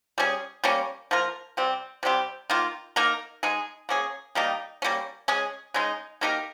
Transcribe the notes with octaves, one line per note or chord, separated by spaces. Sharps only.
G3 C#4 G#4
G3 A#3 C#4
F3 A#3 F4 A#4
C3 G3 C4
C3 G3 C4 G4
D#3 A#3 F4
A#3 D#4 A#4
G#3 D#4 G#4
A#3 C#4 G#4
D#3 G3 A#3 D#4
G3 A#3 C#4
G#3 C#4 G#4
C#3 G#3 D#4
A#3 D#4 G4 A#4